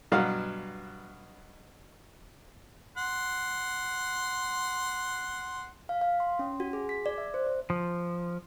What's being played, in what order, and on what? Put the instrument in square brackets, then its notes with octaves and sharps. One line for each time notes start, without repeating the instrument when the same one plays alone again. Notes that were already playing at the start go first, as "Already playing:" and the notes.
[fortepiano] G2 B2 F#3 F5 F#5
[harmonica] F#5 C6
[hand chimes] F5
F5
C6
C#4
F#4
G#4
B6
D5
E5
C5
C5
[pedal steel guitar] F3